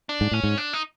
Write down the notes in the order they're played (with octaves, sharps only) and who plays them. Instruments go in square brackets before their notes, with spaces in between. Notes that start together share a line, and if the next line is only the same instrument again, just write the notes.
[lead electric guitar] D4
[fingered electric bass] G#2
[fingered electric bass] A2 [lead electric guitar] C#4
[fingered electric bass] G#2
[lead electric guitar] D4
D#4